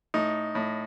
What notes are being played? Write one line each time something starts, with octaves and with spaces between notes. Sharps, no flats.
A2 D#4
A2